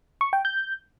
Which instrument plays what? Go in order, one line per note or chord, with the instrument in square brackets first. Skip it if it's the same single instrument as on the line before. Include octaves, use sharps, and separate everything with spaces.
[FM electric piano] C#6
G5
G6